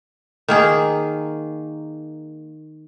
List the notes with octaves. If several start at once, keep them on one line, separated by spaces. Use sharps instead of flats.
D#3 A#3 G#4